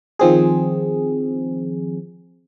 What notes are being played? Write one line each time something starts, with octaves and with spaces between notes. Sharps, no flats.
D#3 F3 C4 G#4